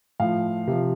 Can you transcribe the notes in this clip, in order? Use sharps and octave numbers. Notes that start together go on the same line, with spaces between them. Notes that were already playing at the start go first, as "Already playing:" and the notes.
A2 F3 F5
C3 F3